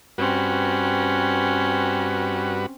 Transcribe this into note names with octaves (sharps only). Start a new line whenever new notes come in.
G2 C4 C#4 F#4 B4